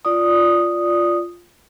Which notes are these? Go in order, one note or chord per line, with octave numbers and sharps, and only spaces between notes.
F4 D5 D#6